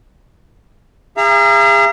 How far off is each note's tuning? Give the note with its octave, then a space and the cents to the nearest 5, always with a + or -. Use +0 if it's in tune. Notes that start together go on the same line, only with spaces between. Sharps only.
G#4 -35 F5 -45 A#5 +0